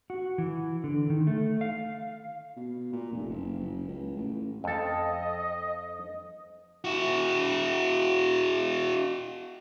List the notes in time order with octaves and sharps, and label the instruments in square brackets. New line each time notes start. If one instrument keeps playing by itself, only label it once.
[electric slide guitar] F#4
E3
D3
D#3
A3
F5
[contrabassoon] B2
A#2
F1
F#1
F#1
C#2
A1
[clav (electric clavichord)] F2 A4 [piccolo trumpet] D#5
[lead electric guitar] E4 F#4